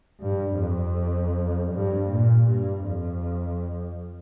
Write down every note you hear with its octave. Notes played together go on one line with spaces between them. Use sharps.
G2
F2
G2
A#2
G2
F2